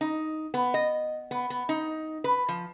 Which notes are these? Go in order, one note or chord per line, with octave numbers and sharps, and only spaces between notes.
D#4
B3
D#5
B3
B3
D#4
B4
F3